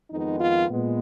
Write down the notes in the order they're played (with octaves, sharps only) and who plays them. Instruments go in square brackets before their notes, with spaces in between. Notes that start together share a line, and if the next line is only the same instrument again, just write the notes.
[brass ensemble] F2 D#3 G#3 B3 D#4
F4
A#2 G#3 B3